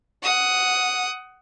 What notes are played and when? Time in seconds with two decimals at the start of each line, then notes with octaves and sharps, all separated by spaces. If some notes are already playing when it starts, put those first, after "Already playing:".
0.23 F#5 D#6